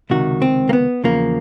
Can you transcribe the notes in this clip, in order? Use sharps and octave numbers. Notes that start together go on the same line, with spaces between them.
C#2 C3 D#3 F#4
C4
A#3
B3
E2 C#3 F3 A#3